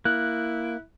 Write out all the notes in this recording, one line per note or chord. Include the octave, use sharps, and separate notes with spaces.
A#3 E4 F#6